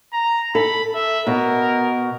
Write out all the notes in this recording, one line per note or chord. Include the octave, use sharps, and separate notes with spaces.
A#5
A4 B5
E5
B2 A#4